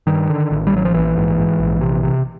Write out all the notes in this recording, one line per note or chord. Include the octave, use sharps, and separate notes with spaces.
G2 D#3
D3
A1
G3
A1 F#3
F3
A#1 E3
G#2
G#2
A#1
C3
C3